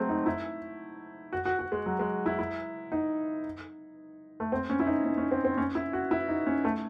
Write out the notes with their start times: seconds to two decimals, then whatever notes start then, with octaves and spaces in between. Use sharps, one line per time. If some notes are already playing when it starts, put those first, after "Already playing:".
Already playing: F#3 G#3 A3 C4
0.09 D#4
0.26 E4
1.33 F#4
1.45 F#4
1.59 F#4
1.72 G#3
1.86 F#3
1.99 G#3
2.26 E4
2.39 E4
2.92 D#4
4.40 A3
4.52 C4
4.70 C#4
4.80 E4
4.87 D#4
5.05 C#4
5.18 C#4
5.31 C4
5.44 C4
5.58 C#4
5.75 E4
5.93 F#4
6.11 E4
6.28 D#4
6.47 C#4
6.65 A3